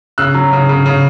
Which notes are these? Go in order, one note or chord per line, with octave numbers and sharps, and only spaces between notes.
C#3 E6 F#6
F#3
C#3
C#3
C#3